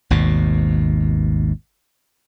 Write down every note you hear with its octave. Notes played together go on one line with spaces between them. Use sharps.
G#1 D#2 B2